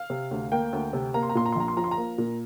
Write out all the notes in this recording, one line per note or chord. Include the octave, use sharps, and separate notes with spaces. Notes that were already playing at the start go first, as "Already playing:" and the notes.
Already playing: F5
C3
D2
A#3 G5
D2
C3
A#3 A#5
C6
A#5
A#2 C6
A#5
C6
A#1 A#5
C6
F3 A#5
C6
A#5
A#3
A#2